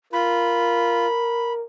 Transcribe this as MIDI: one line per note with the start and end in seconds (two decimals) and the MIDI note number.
0.13 1.06 65
0.13 1.64 70
0.13 1.53 83